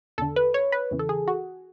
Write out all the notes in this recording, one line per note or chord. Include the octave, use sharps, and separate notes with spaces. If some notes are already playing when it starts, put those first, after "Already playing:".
E2 D3 A4
B4
C#5
B4
E2 C#3 E3
A4
G#4
F#4